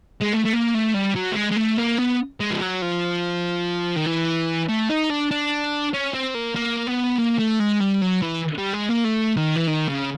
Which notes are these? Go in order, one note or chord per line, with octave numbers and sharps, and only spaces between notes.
G#3
A3
A3
A#3
A3
G3
F#3
A3
G#3
G#3
A3
A#3
B3
G#3
F3
F#3
F3
D#3
E3
A3
D#4
D4
D4
C#4
C4
A#3
A#3
B3
A#3
A3
G#3
G3
F#3
E3
G3
G#3
A#3
A3
D#3
E3
D#3
C#3